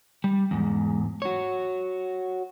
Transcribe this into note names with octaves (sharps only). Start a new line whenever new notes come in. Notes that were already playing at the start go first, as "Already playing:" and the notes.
G3
E2 G#2
F#4 C#5